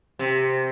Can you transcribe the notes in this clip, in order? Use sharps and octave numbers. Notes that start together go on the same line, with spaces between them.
C3